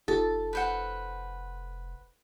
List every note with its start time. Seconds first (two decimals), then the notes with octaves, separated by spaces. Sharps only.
0.08 F1 D#4 F4 G4 A4 A5
0.53 B4 C5 F#5